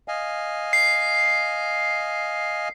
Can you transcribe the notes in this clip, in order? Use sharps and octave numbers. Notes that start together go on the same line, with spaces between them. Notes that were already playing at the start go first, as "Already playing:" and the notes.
D#5 F5 G#5
C7